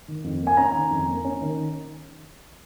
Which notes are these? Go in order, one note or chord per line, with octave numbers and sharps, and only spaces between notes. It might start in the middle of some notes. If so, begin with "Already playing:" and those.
D#3
F2
A#3
G#5
C#4 A#5
D#3
F2
A#3
C#4
D#3